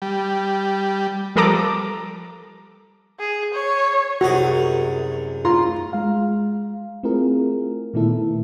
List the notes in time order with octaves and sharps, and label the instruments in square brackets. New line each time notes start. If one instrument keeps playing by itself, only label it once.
[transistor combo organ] G3
[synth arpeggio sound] F3 G3 A4 A#4 A#5 D6
[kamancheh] G#4
C#5
[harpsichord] C2 F#2 G#4 [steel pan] F#4
[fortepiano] F4 A#5 C6
[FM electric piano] G#3 F5
A3 C4 E4 F4 G#4 A#4
A#2 D#3 A3 B3 E4 A4